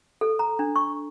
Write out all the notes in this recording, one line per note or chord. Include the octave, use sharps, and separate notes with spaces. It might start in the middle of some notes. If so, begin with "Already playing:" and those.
A4
A#5
D4
C#6